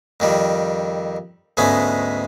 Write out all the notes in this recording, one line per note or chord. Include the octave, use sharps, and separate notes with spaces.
F2 D#3 G3
D2 G#2 G#3 A3 B3 C#4